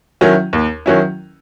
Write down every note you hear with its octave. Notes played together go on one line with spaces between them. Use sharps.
D#3 F#3 C#4 E4
D#2
D#3 F#3 C#4 E4